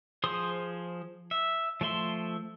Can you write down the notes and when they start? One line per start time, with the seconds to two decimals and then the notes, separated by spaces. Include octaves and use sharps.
0.24 F3 G#4 C5 C6 D#6
1.31 E5
1.81 F3 A3 E5 C6